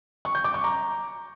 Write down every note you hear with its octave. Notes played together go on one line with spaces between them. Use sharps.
C#6
G6
D6
C#6
A#5